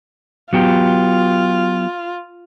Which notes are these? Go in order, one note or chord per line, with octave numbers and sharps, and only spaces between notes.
F#3 B3 F4 G4